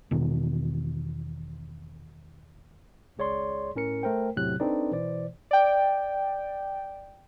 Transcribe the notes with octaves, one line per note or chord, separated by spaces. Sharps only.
E2 B2 D#3
G#1 C#2 G#4 C#5 D5 C6
A2 C#4 A#4 C#7
A3 A#4 C5 G5
E2 A2 C3 F#3 F#6
C4 D4 D#4 A4 B4 D5
B2 E3 C5 D5
D5 G5